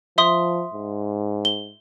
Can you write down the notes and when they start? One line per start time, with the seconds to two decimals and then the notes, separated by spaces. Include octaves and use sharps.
0.18 F3 E5 C6 D#6
0.74 G#2
1.45 G7